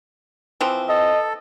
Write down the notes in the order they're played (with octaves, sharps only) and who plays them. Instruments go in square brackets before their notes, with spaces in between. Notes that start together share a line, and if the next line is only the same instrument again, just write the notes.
[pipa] E3 F3 C4
[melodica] A4 [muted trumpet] D#5